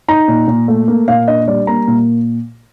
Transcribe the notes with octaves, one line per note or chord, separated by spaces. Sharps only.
D#4 A#5
A#2
A#2
A3
A#3
A#2 F5
D4 D#5
G3 D5
A#3 A#5
A#2